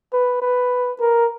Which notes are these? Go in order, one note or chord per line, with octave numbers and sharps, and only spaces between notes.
B4
B4
A#4